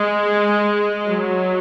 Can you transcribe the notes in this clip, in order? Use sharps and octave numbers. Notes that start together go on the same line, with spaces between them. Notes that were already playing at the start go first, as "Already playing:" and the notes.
Already playing: G#3
F#3